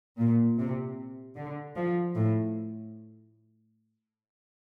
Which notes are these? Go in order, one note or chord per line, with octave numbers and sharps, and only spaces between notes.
A#2
C3
D3
F3
A2